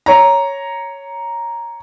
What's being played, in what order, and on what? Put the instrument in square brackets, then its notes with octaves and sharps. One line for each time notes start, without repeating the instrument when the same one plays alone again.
[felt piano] C#5 A#5